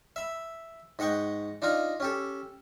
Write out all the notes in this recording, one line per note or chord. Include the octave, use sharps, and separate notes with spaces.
E5 B5
G#2 D#5 F#5 G5 C#6
D4 D#4 F4 G#5 A#5
C#4 G4 A4